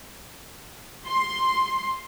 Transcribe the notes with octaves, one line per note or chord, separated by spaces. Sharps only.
C6